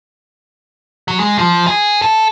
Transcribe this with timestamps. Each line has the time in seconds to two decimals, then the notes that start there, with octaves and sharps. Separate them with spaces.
1.08 F#3
1.20 G#3
1.38 F3
1.67 G#4
2.02 A4